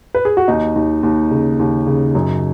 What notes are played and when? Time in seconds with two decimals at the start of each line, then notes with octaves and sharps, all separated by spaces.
0.15 B4
0.25 G#4
0.37 F#4
0.48 D#2 D#4
0.76 D#2
1.03 D#2
1.31 C#3
1.59 D#2
1.87 C#3
2.15 F#2 G#4